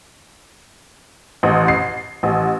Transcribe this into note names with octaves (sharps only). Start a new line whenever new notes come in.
A1
C7
A1